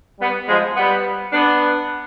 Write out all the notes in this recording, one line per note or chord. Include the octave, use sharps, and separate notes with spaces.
G3 B3
F3 G#3
G3 B3
B3 D4